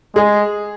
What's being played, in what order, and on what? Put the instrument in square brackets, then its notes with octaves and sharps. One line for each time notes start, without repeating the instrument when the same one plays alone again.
[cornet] G#3 [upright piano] G#4